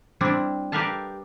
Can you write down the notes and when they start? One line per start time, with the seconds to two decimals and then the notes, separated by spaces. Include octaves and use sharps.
0.21 G3 C4 D4 E4
0.72 G4 A#4 B4 E5 F5 A5